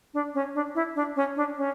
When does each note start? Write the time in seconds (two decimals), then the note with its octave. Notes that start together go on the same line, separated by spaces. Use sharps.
0.14 D4
0.34 C#4
0.55 D4
0.75 E4
0.95 D4
1.16 C#4
1.36 D4
1.57 C#4